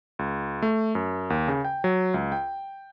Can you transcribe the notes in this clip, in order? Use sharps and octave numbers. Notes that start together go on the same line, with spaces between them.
C#2
A3
F#2
D#2
C#3
G5
F#3
C#2
G5